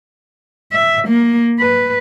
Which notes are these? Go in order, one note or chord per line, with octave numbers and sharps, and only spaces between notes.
E5
A#3
B4